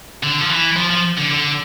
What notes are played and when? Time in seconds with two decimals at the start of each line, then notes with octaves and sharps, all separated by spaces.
0.23 D3
0.41 F3
0.50 E3
0.77 F3
0.90 F3
1.17 D3
1.31 D3